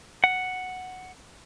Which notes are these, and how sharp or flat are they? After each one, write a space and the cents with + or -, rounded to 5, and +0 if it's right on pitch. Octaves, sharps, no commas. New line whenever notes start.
F#5 +0